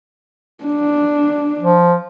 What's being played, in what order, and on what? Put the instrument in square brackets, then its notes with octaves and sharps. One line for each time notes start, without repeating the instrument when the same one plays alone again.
[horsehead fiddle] D4
[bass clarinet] F3